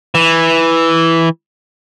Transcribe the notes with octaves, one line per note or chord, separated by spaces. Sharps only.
E3